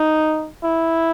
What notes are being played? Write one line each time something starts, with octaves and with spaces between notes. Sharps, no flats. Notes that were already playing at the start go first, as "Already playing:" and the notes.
Already playing: D#4
E4